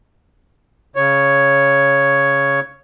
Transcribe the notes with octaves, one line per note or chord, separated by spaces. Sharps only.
C#3 C#5